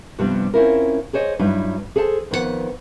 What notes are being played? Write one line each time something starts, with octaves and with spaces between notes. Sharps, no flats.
G2 C3 F3 G3 B3 D4
C4 C#4 E4 F4 A#4
G#4 C5 C#5 D#5
G2 F#3 D#4 E4 F#4
G#4 A4 C5 E5 A5
F2 D#3 B3 A4 F#5